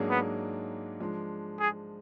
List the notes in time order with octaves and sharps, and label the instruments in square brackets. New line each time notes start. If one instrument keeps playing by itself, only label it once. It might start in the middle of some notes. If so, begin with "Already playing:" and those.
Already playing: [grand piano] G#2 F#3 A#3 D4 G#4
[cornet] B3
[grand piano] F3 G#3 D4
[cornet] G#4